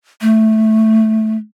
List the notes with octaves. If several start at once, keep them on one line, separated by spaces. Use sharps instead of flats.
A3